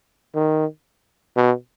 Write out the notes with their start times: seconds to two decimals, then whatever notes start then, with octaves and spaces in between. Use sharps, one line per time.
0.35 D#3
1.37 B2